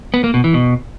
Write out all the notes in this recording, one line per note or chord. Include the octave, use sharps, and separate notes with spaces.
B3
A#3
B2
E3
B2